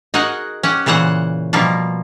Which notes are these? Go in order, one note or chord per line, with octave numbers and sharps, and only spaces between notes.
D#4 F#4 G#4 A#4 F#5
C#4 G4 F#5
A#2 C#3 E3 C5 F#5
B2 F3 G3 A#3